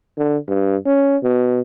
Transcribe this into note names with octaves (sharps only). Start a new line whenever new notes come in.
D3
G2
C#4
B2